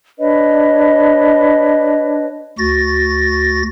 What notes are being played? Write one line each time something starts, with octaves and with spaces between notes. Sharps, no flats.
D4 B4 C#5 D#5
D2 F#4 A6 A#6